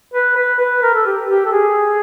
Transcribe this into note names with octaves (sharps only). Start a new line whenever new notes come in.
B4
B4
B4
A#4
A4
G4
G4
A4
G#4